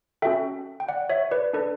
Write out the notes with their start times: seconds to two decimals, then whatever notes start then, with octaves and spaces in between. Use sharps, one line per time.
0.22 C#4 F#4 A4 E5 G5
0.80 G5
0.89 D5 F#5
1.10 C#5 E5
1.31 B4 D5
1.53 D4 A4 B4 D5